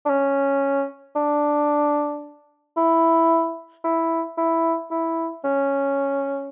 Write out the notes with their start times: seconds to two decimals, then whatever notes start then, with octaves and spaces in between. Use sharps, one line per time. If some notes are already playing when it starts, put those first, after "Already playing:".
0.05 D4
0.10 C#4
1.16 D4
2.77 E4
3.84 E4
4.37 E4
4.91 E4
5.44 C#4